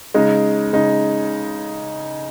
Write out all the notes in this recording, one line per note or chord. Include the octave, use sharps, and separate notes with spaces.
C#3 G#3 D#4
C#3 G#3 D#4